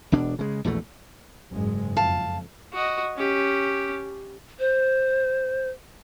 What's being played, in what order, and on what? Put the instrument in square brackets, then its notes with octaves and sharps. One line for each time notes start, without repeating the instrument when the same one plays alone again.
[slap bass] E1 B2 D4
C#3 G#3
A#1 E2 B2 A3
[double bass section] F#1 G#2 G#3
[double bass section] F2 [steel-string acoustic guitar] F5 A5
[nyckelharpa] F#4 D#5
C#4 G4
[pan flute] C5